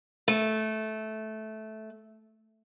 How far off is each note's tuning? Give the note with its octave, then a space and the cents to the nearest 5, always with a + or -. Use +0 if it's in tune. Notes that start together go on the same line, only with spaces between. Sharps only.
A3 -15